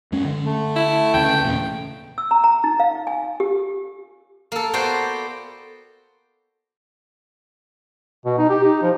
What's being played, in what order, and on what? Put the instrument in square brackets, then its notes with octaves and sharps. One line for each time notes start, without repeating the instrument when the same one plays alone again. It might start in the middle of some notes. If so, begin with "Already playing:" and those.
[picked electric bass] F#2 G#3 C#4
D3
[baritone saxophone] A3
[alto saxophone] E4
[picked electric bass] D2 C#3 [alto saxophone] G5
[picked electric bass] E2 A#2 C#3
[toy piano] E6
A#5
A#5
D#4
F5
G#5
G4
[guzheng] A#3 A4
B3 F#4 C5 D5 G5
[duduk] B2
D#4
G4
D#4
F3